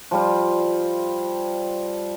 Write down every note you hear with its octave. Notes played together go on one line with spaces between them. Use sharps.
F3 G3 F4